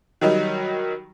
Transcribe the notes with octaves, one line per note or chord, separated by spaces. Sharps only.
D#3 F#3 G3 D#4